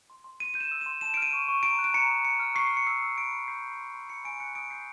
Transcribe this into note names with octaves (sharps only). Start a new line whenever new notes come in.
C6
C6
C6 D#7
G6 D#7
E7
E6
C6 E7
A5 E7
F6 D7
D#7
C#6
C#6
A#5 D7
F#6
D7
A#5 C#7
D#6
C#6 C#7
F6
C#6 C7
F6
C#7
E6 C7
E6
B5 D7
E6
G6 C7
G6
C6
C6
B5 C#7
G#5 D7
F#6 C#7
D#6 D7
G6 C7